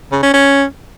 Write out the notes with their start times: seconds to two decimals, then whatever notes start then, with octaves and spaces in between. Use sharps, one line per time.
0.12 C#3
0.23 C#4
0.34 C#4